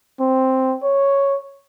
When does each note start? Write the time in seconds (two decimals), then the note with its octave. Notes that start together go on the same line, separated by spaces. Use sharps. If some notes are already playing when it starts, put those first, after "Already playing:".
0.20 C4
0.82 C#5